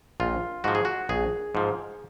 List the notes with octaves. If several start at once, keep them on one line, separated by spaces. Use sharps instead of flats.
A#1 F4
G#2 F3 F#4
G#4
F#4
A#1 G#4
G#2 F3